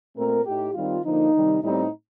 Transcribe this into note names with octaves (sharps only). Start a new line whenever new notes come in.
A#2 A3 C4 A#4
A2 A3 D#4 G4
D#3 G3 C4 D#4 F4
D3 F3 A#3 D#4
C3 D#3 G3
A2 G3 C4 D#4